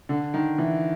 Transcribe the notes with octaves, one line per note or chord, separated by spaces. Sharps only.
D3
D#3
E3